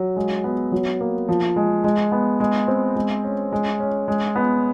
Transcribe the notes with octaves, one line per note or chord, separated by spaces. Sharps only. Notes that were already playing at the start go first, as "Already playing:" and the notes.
Already playing: F#3
G#3
B3
F#3
A#3
F3
G#3
G#3
B3
G#3
C4
G#3
C#4
G#3
C#4
G#3
B3